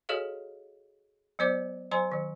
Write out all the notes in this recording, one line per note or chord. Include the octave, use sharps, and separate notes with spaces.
F#4 G#4 A4 C#5 D#5 F5
F#3 B3 C5 D5 D6
F#3 C5 G#5 A#5 C6
D#3 F#3